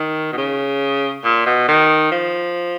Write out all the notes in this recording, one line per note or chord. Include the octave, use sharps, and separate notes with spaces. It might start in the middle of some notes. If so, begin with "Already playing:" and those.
Already playing: D#3
B2
C#3
A#2
B2
D#3
F3